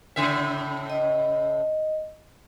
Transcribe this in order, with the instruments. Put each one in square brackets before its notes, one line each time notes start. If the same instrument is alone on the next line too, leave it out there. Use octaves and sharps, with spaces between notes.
[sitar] A2 C#3 E5
[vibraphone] D#5